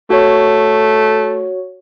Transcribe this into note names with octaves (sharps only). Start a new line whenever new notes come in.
A3 F#4 C#5